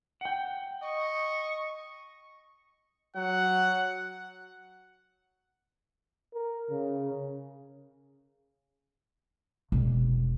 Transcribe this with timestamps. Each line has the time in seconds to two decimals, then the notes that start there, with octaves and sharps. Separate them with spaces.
0.21 F#5 G5
0.81 D#5 C#6
3.16 F#3 F#5
6.34 A#4
6.71 C#3
9.72 E1